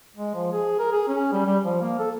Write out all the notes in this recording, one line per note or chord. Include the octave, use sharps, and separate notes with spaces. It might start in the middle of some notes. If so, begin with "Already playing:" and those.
G#3
F3
G#4
A#4
G#4
C#4
G3
G3
F3
A#3
A4